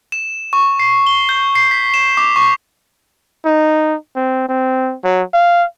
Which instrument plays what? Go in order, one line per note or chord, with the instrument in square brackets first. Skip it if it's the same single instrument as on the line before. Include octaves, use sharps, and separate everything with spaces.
[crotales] E7
C#6
C7
G7
G6
C7
B6
E7
D6
C#6
[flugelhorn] D#4
C4
C4
F#3
F5